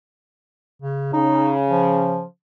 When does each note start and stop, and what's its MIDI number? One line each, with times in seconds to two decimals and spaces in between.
0.82 1.10 49
1.13 2.23 49
1.13 1.53 63
1.70 2.24 53